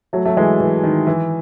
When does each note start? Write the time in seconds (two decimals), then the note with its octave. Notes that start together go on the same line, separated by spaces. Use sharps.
0.13 F#3 A3
0.25 F#3 A3
0.37 E3 G#3
0.60 E3
0.83 D#3
1.07 E3